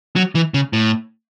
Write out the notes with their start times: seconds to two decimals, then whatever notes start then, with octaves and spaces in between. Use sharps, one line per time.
0.16 F#3
0.35 E3
0.54 C#3
0.73 A2